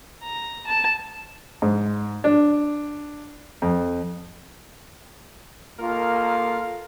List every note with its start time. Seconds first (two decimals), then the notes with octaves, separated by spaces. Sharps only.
0.23 A#5
0.67 A5
1.62 G#2
2.24 D4
3.62 F2
5.79 A#3 F4 A4 A#4 F5